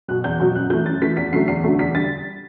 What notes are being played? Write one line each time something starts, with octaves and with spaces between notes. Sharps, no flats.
B2 F#3 F#6
E2 G6
B2 F#3
F#2 F#6
E3 A3 G6
F#2 A6
E3 A3 B6
E2 B6
D3 F#3 A3 C7
E2 C7
D3 F#3 A3
E2 B6
D3 G3 A6